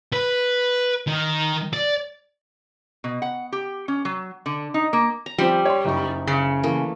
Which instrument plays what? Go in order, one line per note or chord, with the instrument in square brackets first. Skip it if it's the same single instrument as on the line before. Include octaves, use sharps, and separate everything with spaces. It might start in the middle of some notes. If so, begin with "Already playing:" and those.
[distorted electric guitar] B4
D#3
D5
[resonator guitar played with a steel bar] B2
F#5
G4
C#4
F#3
D3
D#4
A#3
[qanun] A#5
[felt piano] F3 C4 [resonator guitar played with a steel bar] G3 [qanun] G4 E5
[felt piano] C#5 D5 C6
F#1 D#4 C#6
[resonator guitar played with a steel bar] C#3
[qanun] E3 A3 A#3